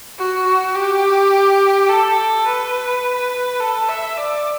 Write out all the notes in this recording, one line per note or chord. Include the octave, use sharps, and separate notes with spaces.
F#4
F#4
G4
A4
B4
A4
E5
D5